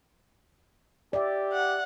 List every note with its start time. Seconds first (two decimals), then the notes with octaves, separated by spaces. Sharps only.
1.13 G4 D5 E5
1.53 F#5